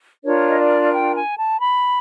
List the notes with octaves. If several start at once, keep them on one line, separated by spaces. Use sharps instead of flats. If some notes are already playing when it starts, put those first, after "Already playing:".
D4 F4 A#4 C#5
D#5
D5
G5
G#5
A5
B5